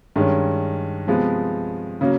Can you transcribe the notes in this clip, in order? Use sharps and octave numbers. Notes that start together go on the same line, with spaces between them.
G2 D#3 G#3 C#4
C3 F3 G#3 B3
C#3 F#3 A#3